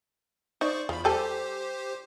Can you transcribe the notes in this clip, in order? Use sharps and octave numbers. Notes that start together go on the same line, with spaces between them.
D#4 C5 D5 C#6
E2 F3 B5
G3 G4 A4 C5 G#5